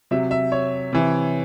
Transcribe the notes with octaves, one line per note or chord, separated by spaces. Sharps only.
C3 F#3 E5
E5
C#5
C3 E3